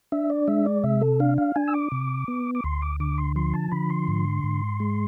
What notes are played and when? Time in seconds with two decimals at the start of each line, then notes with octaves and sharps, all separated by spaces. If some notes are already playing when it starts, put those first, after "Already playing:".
0.12 D4 E5
0.30 D5
0.48 G#3 E5
0.66 D5
0.84 C3 E5
1.01 A4
1.20 D4 F5
1.38 F5
1.56 D4 G#5
1.68 E6
1.74 D6
1.92 C3
2.28 B3
2.55 D6
2.64 D2 C6
2.82 D6
3.00 D3 D6
3.18 C6
3.36 F3 C6
3.54 A5
3.72 D3 B5
3.90 C6
4.08 G#2
4.44 G#2
4.80 G#3